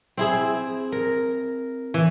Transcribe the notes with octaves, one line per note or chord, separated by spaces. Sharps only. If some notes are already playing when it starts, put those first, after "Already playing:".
C4 E4 G#4
A#4
E3